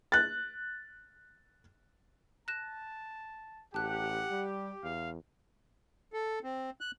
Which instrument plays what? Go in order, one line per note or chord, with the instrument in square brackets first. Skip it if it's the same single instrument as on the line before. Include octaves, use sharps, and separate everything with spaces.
[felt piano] F#6 A6
[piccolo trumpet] A5 [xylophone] F#6 A#6 E7
[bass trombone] A1 [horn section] G4 [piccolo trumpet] F#5 [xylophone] A5 F#6
[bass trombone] G3
[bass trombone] E2 [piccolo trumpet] F5
[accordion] A4
C4
F#6